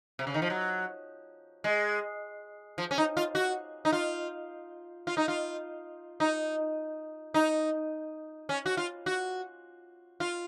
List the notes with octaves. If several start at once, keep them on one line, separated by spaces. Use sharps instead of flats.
C3
C#3
D#3
F3
F#3
G#3
F3
C#4
D#4
F4
F#4
D#4
F4
F4
D#4
F4
D#4
D#4
C#4
F#4
F4
F#4
F4